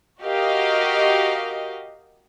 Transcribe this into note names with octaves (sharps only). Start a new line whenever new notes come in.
F#4 G4 A#4 D#5 F5